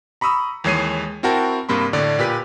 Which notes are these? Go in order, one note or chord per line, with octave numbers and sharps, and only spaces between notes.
A#5 B5 C#6 D#6 E6
D#2 E3 G#3 C#5 C7 D#7
C4 E4 F#4 A#4 G5 A5
G2 C3 A#3 B5 C6
A2 D3 D5
A#2 G4 B4 B6